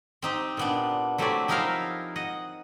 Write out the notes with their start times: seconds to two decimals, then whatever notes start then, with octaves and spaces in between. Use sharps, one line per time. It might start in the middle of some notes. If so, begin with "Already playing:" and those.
0.22 C4 D#4 G4
0.57 A#2 B3 D4
1.18 F#3 A3 C4 E4 G4 D5
1.48 F3 D#4 E4 A#4 E5 F5
2.16 D#5 F#5